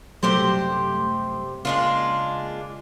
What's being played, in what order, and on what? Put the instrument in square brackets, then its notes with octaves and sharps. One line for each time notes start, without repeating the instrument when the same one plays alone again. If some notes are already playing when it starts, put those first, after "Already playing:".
[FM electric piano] F#2 G3 A3 [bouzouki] C3 G4 C5
[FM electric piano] C#3 A#3 [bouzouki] G#3 D4 F4